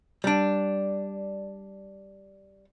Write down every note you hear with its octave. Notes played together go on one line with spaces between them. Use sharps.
G3 D4